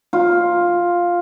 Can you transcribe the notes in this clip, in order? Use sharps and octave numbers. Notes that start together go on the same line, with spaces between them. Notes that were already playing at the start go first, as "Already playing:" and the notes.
F4